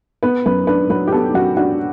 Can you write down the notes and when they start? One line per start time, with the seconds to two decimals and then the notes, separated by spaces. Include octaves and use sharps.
0.23 B3 B4
0.46 F#2 B4
0.67 D4 B4
0.90 F#3 B4
1.07 G4
1.12 B3 A4
1.34 F#2 F#4
1.57 D4 F#4